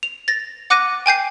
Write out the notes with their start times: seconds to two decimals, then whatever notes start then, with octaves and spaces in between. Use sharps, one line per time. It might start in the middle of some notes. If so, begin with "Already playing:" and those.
0.03 F7
0.28 A6 A#6
0.70 F#5 D6 F#6 A#6 D#7
1.06 G5 G#5 G6 C7